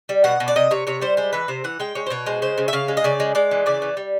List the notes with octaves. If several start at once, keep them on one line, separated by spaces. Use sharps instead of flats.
G3
B2 F#5
B2
D5
C3 D#5
C3 C#5
C3 C#5
G3 C5
G#3 C5
E3 B4
C3 C5
E3 F#5
G#3 G5
G#3 C#5
C5
B2 C#5
G#3 C5
C#3 C5
C#3
E5
C#3 F5
G#3
D#5
C#3 D5
G#3
G#3 D5
E3
C#3 D5
E3
G3